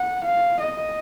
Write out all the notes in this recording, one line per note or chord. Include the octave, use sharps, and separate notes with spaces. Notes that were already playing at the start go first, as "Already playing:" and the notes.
Already playing: F#5
F5
D#5